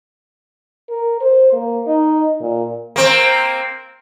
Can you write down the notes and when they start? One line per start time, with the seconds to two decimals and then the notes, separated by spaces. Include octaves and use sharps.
0.90 A#4
1.21 C5
1.53 A#3
1.87 D#4
2.41 A#2
2.96 A#3 C4